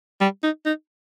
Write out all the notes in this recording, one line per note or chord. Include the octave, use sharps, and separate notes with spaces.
G3
D#4
D#4